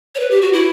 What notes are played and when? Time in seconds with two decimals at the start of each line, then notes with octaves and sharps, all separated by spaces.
0.15 C#5
0.20 B4
0.31 G4
0.42 F#4
0.53 E4